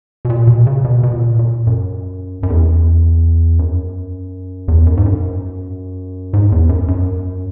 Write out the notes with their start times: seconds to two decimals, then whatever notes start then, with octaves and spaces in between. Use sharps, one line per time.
0.25 B2
0.30 A#2
0.47 B2
0.67 C#3
0.84 B2
1.03 B2
1.12 A#2
1.39 A#2
1.67 F#2
2.43 F#2
2.50 E2
3.59 F#2
4.68 E2
4.86 F#2
4.97 G#2
5.06 F#2
6.33 G#2
6.52 E2
6.69 F#2
6.88 F#2